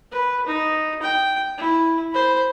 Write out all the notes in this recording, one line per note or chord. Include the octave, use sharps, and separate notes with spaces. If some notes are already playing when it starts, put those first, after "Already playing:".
B4
D#4
G5
E4
C5 B5